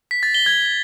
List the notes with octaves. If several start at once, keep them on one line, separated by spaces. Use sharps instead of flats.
B6
A6
G7
G#6